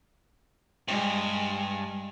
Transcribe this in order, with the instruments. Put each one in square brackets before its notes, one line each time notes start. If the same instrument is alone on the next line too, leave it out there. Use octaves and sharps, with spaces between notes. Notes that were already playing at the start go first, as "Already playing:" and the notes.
[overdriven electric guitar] G2 [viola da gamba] G#3